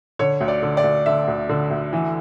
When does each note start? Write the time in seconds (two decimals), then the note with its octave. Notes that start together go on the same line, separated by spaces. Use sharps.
0.19 D3 C#5
0.41 D2
0.48 D5
0.62 D3
0.77 D5
0.84 D2
1.06 D3 E5
1.28 D2
1.49 D3
1.71 D2
1.93 E3